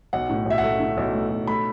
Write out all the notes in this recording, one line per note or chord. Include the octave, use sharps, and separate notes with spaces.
B1 F#5
A2
B1 E5
F#5
A3
A2
B1
A3
B1
A3 B5